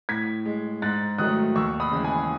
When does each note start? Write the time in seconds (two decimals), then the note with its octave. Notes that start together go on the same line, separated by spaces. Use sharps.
0.09 A2 G#6 B6
0.45 G#3
0.82 G#2 F#6 A6
1.18 D#3 F#3 A3 D#6 F#6
1.55 D#2 C#6 E6
1.80 B5 D#6
1.92 C#3 E3 G#3
2.04 G#5 B5